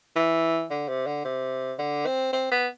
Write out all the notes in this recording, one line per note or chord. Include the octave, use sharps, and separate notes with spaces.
E3
D3
C3
D3
C3
D3
C4
C4
B3